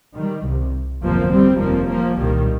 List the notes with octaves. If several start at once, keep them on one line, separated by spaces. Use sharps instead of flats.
D#3 G3
C2 C3
G1 F2 C3 F3 A#3
G3 C4
F1 D#2 F3 A#3
F3 A#3
C2 A#2 D#3 G3